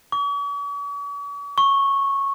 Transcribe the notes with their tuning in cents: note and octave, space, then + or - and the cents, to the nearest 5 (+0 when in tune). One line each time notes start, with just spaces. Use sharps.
C#6 +45
C#6 -10